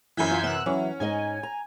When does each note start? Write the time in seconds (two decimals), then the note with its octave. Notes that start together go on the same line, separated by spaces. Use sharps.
0.17 F#2 E3 G#5 G6 B6
0.30 B3 F4
0.43 C3 B3 E6 F#6
0.66 E3 F#3 C#4
1.00 G#2 D#4 D#5 G#5
1.43 A#5